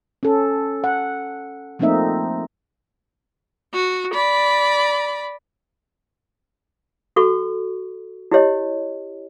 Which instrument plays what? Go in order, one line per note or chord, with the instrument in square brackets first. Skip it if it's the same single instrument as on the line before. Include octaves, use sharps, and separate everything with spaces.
[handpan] C#4 A4
F#5
F3 A3 A#3 C4 D#4 E5
[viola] F#4
D5 B5
[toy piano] F#4 A4 C#6
E4 G4 C#5 D#5